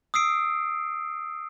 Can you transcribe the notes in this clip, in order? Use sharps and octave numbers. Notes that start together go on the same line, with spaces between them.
D#6 E6 C7 D7